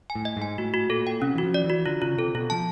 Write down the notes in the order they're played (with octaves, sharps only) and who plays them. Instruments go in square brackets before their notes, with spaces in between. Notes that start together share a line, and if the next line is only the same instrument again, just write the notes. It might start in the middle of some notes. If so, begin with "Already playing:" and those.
[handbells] G#5
[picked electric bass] A2
[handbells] D#5
[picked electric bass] G#2 [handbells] G#5
[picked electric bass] A2 [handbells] F#4
[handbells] F#4
[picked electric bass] A#2 [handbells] A4
[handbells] G5
[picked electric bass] C3 [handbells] C#4
[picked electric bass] E3
[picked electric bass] F3 [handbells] F#4
[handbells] D5
[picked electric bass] E3
[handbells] F#4
[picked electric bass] D3 [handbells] F4
[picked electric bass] C#3 [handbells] F4
[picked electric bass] C3 [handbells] A4
[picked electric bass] B2 [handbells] F4
[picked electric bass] F3 [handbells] A5